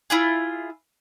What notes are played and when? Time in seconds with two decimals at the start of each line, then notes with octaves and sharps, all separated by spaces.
0.10 E4 F4 G#4